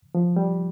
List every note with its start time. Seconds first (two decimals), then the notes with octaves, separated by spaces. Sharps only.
0.15 F3
0.36 G3